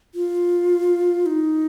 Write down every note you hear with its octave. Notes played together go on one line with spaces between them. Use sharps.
F4
D#4